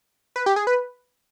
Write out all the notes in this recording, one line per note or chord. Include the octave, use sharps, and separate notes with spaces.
B4
G4
G#4
B4